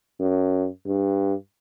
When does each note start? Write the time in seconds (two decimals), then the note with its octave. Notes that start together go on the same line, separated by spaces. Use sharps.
0.20 F#2
0.86 G2